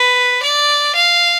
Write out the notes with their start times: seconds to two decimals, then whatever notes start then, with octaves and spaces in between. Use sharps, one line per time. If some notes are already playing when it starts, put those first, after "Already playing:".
Already playing: B4
0.43 D5
0.96 F5